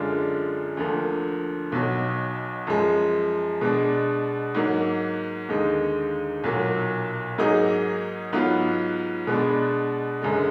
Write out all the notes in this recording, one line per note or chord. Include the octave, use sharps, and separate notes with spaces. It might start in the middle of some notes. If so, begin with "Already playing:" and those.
Already playing: F#2 D3 G#3 D4 F4
D2 D3 F3 A#3
B1 B2 F#3
F#2 F3 G#3
B2 G#3 D4
G#2 F#3 A#3
D#2 D3 G#3 D#4
B1 A#2 F#3 A#3
G#2 F#3 A#3 D#4 G#4
G#2 F#3 B3 F4
B2 G#3 B3 D4
F#1 F#2 D3 G#3